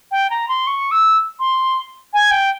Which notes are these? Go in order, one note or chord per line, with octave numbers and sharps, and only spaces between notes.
G5
A#5
C6
C#6
E6
C6
G#5
G5